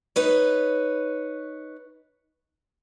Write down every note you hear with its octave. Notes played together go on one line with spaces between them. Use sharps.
D#4 B4 C#5